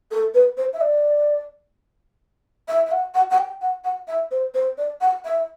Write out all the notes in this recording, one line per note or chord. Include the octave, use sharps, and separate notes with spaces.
A4
B4
C5
E5
D5
E5
E5
F#5
F#5
F#5
G5
F#5
F#5
E5
C5
C5
D5
F#5
E5